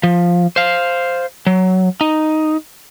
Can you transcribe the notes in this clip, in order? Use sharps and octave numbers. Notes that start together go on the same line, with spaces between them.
F3
C5 F5
F#3
D#4